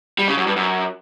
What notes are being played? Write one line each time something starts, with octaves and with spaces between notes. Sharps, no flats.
G3
C#3
F#2
G2
F#2